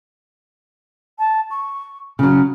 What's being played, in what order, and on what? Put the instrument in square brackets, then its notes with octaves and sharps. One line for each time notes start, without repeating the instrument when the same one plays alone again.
[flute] A5
C#6
[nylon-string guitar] C#3 F#3 [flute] F6